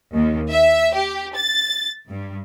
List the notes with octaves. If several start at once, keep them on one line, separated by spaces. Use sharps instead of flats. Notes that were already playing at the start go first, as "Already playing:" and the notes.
D#2
E5
G4
A6
G2